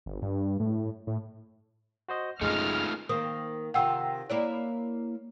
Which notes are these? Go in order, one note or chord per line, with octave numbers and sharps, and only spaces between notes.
G1
G2
A2
A2
F#4 C5 D#5
F#2 C#3 G#3 A3 D#4 F4 F6
D#3 A#3 C4 D#6
C3 D#3 F4 F#5 G5 E6
A#3 E4 C#5 D5